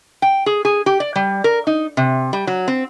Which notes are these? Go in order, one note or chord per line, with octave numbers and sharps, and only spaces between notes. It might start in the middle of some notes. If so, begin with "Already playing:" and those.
G5
G#4
G#4
G4
D5
G3
A#4
D#4
C3
G3
F#3
C4